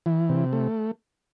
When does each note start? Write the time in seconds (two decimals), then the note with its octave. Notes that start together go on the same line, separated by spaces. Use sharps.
0.06 E3
0.29 C3
0.53 A3